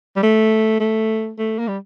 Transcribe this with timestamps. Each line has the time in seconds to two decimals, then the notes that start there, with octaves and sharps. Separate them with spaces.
0.17 G3
0.23 A3
0.80 A3
1.38 A3
1.59 A#3
1.68 G3